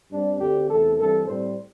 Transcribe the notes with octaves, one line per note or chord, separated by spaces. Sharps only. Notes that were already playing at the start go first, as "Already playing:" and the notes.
G2 G3 C4 D4
D2 D3 A3 C4 G4
E2 C3 A3 A4
G2 E3 C4 A4
A2 G3 C4 C5